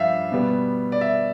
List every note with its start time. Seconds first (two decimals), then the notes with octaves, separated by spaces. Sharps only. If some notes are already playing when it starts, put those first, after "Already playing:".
Already playing: G2 F3 E5 F5
0.32 B2 G3 B3
0.92 D5
1.01 E5